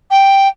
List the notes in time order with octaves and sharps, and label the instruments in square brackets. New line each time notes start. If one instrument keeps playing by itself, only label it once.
[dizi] G5